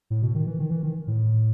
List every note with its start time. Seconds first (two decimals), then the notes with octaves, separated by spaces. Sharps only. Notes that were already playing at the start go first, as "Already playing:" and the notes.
0.10 A2
0.22 B2
0.35 D#3
0.47 E3
0.59 D#3
0.71 E3
0.83 D#3
1.07 A2